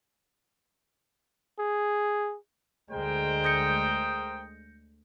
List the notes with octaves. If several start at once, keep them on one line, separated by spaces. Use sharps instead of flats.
G#4
D2 G#3 A#4 C5 G5
D#6 G6 A#6 C#7